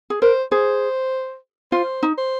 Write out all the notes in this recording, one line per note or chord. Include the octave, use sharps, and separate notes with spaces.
G#4
A#4 C5
G#4 C5
F4 C5
D#4
C5